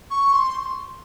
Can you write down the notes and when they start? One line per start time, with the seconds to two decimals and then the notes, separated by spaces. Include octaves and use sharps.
0.10 C#6
0.32 C6